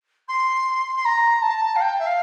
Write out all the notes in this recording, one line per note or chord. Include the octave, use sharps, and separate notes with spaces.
C6
C6
A#5
A5
F5
G5
E5
F5